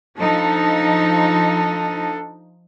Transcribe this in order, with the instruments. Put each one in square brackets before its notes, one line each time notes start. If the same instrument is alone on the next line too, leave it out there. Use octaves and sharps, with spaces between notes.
[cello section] F3 D#4 [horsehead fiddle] D4 A4